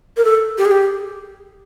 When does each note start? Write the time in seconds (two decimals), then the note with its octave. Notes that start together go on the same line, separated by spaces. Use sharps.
0.17 A#4
0.25 A4
0.58 G4
0.65 G#4
0.71 G4